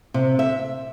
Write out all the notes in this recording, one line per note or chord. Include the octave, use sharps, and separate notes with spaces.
C3
E5